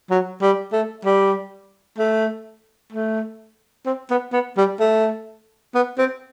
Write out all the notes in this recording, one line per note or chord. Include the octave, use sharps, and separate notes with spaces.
F#3
G3
A3
G3
A3
A3
C4
B3
B3
G3
A3
B3
C4